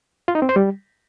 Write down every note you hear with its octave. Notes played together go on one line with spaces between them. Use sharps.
F4
D#4
C4
C5
G3